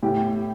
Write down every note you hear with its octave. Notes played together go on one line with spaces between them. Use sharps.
A2 G4